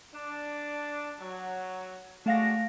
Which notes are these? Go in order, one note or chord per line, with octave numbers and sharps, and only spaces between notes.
D4
F#3
G#3 A3 D4 F#4 F5 A#6